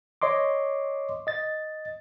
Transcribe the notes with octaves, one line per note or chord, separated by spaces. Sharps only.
C#5 D#5 C6 D6
D#5 A6